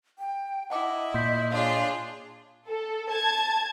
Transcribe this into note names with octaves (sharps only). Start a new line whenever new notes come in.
G5
E4 D#5 F#5 A5 D6
A#2 C6 G6 B6
D4 F4 G#4 C#5 F5 C6
A4
A5 G#6